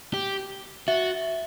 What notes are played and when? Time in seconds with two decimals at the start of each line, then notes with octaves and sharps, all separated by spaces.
0.14 G4
0.88 F#4 E5